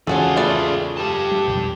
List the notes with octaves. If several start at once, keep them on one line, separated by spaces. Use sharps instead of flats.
E2 G#2 C#3 C#4 F4 F#4 G#4 A4
A3 B4 D5
G4 A5
G3
B1 F2